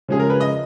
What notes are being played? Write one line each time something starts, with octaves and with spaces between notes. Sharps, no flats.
C#3 F3 G#3 C#4 G#4
A#4
B4
D#5